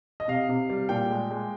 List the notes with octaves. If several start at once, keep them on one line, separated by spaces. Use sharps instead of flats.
D#5
C3 F5
C3
G3
A#2 G5
G#3
G#3